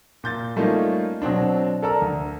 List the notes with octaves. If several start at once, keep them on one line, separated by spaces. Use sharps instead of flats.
A#2 G6 A6
G3 A3 A#3 C#4 D#4 F4
B2 F#3 C4 D4
A4 A#4 D5 A#5 E6
D2